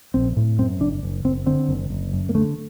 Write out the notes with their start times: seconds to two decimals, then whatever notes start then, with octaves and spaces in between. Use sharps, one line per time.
0.14 A#1 C4
0.37 A2
0.59 F#2 C4
0.80 F#1 D4
1.03 F#1
1.25 F#1 C4
1.46 D3 C4
1.68 F#1
1.90 F#1
2.13 F#2
2.29 A#3
2.35 D3 A3